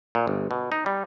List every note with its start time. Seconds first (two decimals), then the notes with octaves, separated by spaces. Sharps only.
0.15 A#2
0.27 G1
0.51 B2
0.72 D#4
0.86 G3